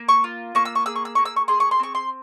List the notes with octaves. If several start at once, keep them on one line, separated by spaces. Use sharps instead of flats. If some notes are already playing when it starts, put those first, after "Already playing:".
Already playing: A#3
C#6
F4
A#3 C#6
E6
C#6
G#4 E6
C#6
E6
A#3 C#6
E6
C#6
G#4 C6
C#6
C6
C4 C#6
C6